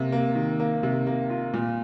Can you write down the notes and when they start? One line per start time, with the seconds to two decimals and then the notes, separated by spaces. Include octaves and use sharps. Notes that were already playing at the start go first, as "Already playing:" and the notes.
Already playing: C3 A#3
0.12 A#3
0.35 D#3
0.60 A#3
0.83 C3
1.07 A#3
1.30 F4
1.54 A#2